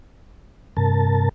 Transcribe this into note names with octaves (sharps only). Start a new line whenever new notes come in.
G2 C3 A#4 A5